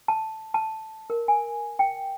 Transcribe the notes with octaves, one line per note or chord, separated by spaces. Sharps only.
A5
A5
A#4
G#5
G5